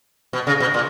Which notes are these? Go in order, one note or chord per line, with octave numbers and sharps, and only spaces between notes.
B2
C#3
B2
A#2